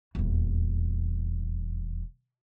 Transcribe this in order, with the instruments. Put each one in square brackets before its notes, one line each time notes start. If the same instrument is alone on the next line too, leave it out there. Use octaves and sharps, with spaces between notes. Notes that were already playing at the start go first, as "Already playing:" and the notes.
[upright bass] D#1 E2